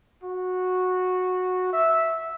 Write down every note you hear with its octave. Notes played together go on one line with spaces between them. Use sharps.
F#4
E5